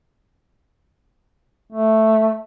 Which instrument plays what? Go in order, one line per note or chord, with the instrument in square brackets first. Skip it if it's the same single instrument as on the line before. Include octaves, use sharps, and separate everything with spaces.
[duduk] A3